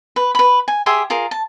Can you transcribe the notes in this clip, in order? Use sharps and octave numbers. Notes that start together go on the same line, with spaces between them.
B4
B4 B5
G#5
G4 G#4 E5 C6
F4 G#4 A#4
A5